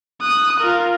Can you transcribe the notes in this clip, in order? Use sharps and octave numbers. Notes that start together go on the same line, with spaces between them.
D#6 F#6
F4 A#4